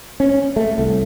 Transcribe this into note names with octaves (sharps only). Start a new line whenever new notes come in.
C#4
A3
C2